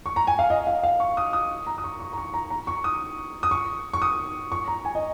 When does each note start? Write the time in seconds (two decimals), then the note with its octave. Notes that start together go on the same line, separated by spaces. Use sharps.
0.06 C#6
0.16 A#5
0.27 G#5
0.39 F5
0.50 D#5
0.67 F5
0.83 F5
1.00 C#6
1.17 D#6
1.33 D#6
1.67 A#5
1.78 D#6
1.84 C#6
2.00 C#6
2.13 A#5
2.18 C#6
2.34 A#5
2.50 A#5
2.67 C#6
2.84 D#6
3.43 D#6
3.51 C#6
3.93 C#6
4.02 D#6
4.52 C#6
4.68 A#5
4.85 G#5
4.95 D#5